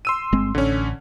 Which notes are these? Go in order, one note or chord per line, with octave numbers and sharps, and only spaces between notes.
C6 E6 D#7
G1 G#3 C4
A1 D3 C#4